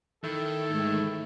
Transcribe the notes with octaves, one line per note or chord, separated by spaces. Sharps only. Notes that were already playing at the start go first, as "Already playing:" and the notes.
D#3 E4 A4
G#2 A3